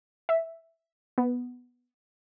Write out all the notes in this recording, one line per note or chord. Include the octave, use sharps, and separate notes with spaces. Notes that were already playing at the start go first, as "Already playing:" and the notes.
E5
B3